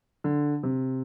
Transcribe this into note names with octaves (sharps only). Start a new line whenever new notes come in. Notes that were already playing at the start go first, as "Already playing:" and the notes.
D3
C3